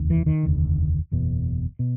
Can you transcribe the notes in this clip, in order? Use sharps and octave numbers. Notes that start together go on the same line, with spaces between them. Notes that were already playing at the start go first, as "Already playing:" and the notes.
Already playing: F1 D#2
E3
D#3
F1 D#2 D3
F#1 E2 B2
B2